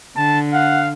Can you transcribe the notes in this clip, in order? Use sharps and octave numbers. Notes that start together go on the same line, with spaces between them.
D3 A5
F5 F#5